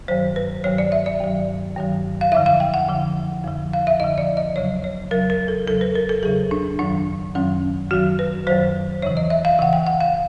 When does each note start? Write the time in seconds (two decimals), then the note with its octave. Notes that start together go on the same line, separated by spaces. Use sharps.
0.08 G2 D#3 F#3 C5
0.36 B4
0.64 G2 D#3 F#3 C#5
0.78 D5
0.92 E5
1.06 D5
1.20 G2 D#3 F#3
1.77 G2 D#3 F#3
2.21 F5
2.32 F2 D3 F3 E5
2.46 F5
2.60 G5
2.74 F#5
2.88 F2 D3 F3
3.44 F2 D3 F3
3.73 F5
3.87 E5
4.00 F2 D3 F3 D#5
4.18 D5
4.37 D#5
4.56 E2 C#3 F#3 C#5
4.84 C#5
5.11 E2 C#3 F#3 A#4
5.30 A#4
5.48 A4
5.67 E2 C#3 F#3 A4
5.81 B4
5.95 A#4
6.09 A4
6.23 E2 C#3 F#3 G#4
6.51 D4
6.79 F#2 D#3 F#3 D4
7.35 F#2 D#3 F#3 C#4
7.91 F#2 D#3 F#3 F#4
8.19 B4
8.47 F#2 D#3 F#3 C5
9.02 E2 C#3 E3 C#5
9.17 D#5
9.30 E5
9.45 F5
9.59 E2 C#3 E3 F#5
9.73 G5
9.87 F#5
10.01 F5